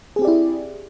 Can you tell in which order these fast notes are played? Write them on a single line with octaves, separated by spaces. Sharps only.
G#4 C4 G4 D5 E4